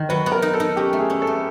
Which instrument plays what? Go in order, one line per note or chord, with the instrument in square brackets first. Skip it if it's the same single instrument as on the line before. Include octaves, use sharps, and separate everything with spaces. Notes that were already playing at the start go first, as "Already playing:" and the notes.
Already playing: [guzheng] D#3
[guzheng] F#3 [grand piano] B4
[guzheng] B3
[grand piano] A#4
[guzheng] D#4
[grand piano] A4
[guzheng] D#4
[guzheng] C#4 [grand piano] G4
[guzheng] A3
[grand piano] G#4
[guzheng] C#4
[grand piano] A4
[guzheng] A3